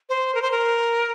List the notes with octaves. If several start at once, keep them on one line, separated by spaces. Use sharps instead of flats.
C5
A#4
C5
A#4